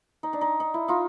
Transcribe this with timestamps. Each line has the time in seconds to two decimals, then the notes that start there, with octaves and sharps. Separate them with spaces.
0.23 D#4
0.33 D4
0.41 D#4
0.60 D#4
0.74 E4
0.88 D#4 F4